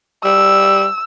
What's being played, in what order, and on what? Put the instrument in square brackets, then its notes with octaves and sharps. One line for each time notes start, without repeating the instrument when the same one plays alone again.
[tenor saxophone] G3 [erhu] E6